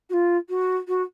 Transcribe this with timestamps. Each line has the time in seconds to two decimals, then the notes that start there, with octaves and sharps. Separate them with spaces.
0.09 F#4
0.13 F4
0.49 F#4
0.88 F#4